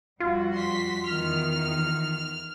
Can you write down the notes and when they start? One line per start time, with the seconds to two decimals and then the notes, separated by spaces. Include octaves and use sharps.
0.20 F2 G3 F4 F#4
0.54 C6 B6
1.06 E2 D#3 F6